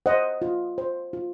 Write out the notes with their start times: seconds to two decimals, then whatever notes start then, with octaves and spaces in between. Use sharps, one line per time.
0.06 C5 D#5 F#5
0.42 F4
0.78 C5
1.13 F4